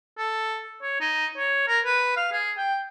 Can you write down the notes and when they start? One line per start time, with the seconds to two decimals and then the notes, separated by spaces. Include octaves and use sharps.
0.18 A4
0.82 C#5
1.01 D#4
1.37 C#5
1.67 A#4
1.85 B4
2.17 F5
2.32 G#4
2.57 G5